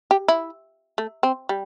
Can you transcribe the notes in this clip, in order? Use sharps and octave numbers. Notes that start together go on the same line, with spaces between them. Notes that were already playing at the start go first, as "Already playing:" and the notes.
G4
E4
A3
C4
G3